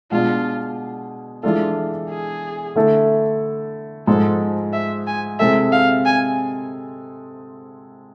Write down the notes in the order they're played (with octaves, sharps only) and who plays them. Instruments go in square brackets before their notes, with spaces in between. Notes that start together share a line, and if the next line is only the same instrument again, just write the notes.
[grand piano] B2 G#3 D4 [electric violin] F4
[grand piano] E3 G#3 D4 A4 [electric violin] F4
[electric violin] G#4
[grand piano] D3 A3 E4 A4
[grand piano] G#2 F3 G#3 [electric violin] A4
[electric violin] E5
G#5
[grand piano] C3 G#3 C4 E4 A4 [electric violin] E5
[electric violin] F5
G#5